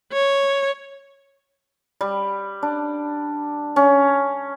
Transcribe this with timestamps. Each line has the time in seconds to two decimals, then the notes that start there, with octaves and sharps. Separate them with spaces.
0.12 C#5
2.01 G3
2.63 D4
3.76 C#4